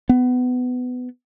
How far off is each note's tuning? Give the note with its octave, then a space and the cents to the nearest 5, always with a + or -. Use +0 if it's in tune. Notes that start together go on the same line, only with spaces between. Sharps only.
B3 +20